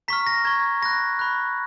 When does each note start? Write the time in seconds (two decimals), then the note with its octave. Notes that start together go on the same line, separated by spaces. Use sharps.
0.08 A#5 C#6 F6 B6
0.27 A#6
0.45 A#5 C#6 F6 G#6
0.82 B5 F#6 A#6
1.19 B5 F#6